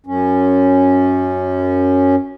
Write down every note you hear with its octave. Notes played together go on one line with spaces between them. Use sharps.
F#2 C#4